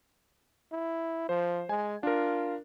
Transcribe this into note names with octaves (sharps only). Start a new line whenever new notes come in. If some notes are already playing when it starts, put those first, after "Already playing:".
E4
F3 C5
G#3 G#5
D4 F4 A#4